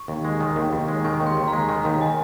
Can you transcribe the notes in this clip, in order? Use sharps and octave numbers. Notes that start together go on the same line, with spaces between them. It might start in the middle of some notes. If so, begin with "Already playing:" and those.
Already playing: C#6
D#2
G#3
D#3
D#2
D#2
G#3
D#3 C#6
D#2
C6
D#2
A#5
G#3
D#3 A#5
D#2
G#5